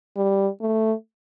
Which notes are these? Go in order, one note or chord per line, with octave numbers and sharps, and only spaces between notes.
G3
A3